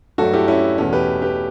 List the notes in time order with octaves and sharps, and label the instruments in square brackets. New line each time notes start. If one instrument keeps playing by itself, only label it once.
[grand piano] G2 F#3 A3 F#4 A4
E4 G4
C#4 E4
E2 B2 A3 C#4
G4 B4
G4 B4